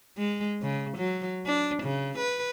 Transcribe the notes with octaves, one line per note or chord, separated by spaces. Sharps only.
G#3
C#3
F#3
D4
C#3
B4